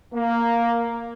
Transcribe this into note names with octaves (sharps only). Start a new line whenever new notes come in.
A#3